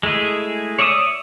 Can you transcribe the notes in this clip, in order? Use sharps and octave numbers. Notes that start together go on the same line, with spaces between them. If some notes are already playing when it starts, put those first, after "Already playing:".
G#3 A3 E4 G#4
C#5 D5 E5 F#5 D#6